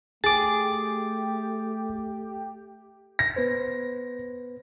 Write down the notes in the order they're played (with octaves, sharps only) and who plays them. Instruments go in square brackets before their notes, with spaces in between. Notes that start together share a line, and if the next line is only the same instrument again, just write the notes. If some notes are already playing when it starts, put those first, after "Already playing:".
[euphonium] A3 [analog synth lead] G4 [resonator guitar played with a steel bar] G#4 [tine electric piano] D6 A6
[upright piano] A#6
[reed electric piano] B3 B4 C5